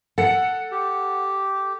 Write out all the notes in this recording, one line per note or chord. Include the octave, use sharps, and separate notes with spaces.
A4 F#5 C#7
G4